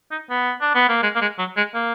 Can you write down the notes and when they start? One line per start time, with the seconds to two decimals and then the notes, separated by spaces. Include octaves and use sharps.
0.11 D#4
0.30 B3
0.61 D4
0.75 B3
0.89 A#3
1.03 G#3
1.15 A#3
1.21 G#3
1.38 F#3
1.57 G#3
1.74 A#3